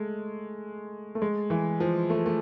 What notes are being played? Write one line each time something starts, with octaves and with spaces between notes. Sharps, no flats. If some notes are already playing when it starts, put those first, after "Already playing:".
Already playing: G#3 A3
A3
G#3
E3
F3
A3
A3